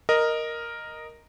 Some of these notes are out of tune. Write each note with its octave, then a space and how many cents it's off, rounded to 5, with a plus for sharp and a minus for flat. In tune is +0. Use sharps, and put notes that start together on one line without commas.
A#4 +0 D#5 -5